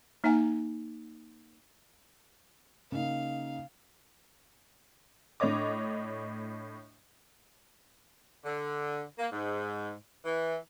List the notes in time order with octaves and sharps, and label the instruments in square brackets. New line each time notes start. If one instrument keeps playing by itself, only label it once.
[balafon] A#3 D#4 E5 F#5 G#5 A#5
[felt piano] C#3 A#3 D#4 [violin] F5
[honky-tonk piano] A2 D4 C#5 D#5 D6
[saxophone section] D3
A#3
G#2
E3